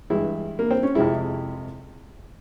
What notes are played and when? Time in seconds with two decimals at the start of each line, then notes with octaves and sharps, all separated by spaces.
0.10 G2 E3 G#3 E4
0.59 A#3
0.71 C4
0.83 C#4
0.95 F2 C3 F3 G#3 E4